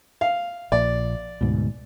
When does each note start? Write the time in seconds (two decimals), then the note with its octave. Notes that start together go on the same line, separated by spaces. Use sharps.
0.21 F5
0.72 A#1 A#2 D5
1.41 D2 G#2 B2